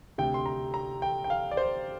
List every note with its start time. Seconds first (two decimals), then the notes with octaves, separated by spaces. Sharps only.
0.18 D2 C3 G5
0.34 C6
0.46 A#5
0.74 A#5
1.02 G5
1.24 G5
1.30 F5
1.51 D5
1.57 C5